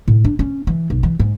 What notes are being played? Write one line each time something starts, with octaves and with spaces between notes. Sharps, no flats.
A2
D4
C#4
E3
B1
E3
G#2